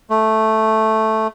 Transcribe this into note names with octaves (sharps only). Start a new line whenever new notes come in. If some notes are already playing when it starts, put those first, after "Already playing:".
A3